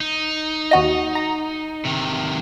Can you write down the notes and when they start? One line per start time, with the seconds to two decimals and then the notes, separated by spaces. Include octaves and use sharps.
0.01 D#4
0.71 D#2 F#4 D#5
1.15 A#5
1.85 C3 D#3